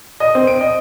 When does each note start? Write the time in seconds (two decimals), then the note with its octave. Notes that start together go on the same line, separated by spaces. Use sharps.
0.20 D#5
0.35 C4
0.47 D7
0.61 D#5